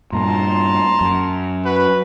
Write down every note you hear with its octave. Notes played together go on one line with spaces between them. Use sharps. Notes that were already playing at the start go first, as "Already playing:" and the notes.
G2 A#2 A5 A#5 C6
F#2
F#4 B4